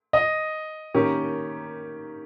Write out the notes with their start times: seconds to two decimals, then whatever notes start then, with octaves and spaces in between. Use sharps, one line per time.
0.13 D#5
0.94 D#3 A#3 C#4 G4